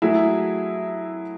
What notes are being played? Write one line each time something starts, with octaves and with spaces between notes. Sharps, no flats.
F#3 A3 E4 G#4